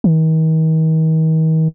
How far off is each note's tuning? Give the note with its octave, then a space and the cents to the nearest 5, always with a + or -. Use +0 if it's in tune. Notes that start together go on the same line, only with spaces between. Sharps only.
D#3 +40